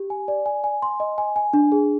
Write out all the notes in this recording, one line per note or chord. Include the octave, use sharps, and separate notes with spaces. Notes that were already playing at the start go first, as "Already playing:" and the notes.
Already playing: G4
G#5
D5
G#5
G#5
C6
D#5
G#5
G#5
D4
G#4